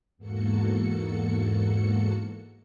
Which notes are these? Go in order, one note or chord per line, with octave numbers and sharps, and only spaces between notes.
E2 G#2 A#3 F#4 A4 C#7